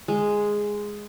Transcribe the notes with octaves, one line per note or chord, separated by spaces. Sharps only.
G#3